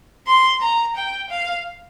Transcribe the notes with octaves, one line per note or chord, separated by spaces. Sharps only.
C6
A#5
G5
F5